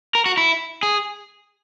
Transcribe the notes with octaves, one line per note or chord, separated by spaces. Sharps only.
A#4
F#4
E4
G#4